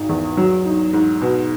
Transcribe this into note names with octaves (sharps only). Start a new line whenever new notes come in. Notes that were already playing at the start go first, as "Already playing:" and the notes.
Already playing: G#1 D#4
E2
F#3
D#4
G#2
B2